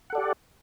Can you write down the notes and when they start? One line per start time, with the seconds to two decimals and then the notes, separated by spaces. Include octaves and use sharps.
0.10 F#5
0.12 A4
0.15 D5
0.18 G4